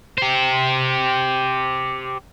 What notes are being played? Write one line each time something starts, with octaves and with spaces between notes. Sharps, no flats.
G4 C5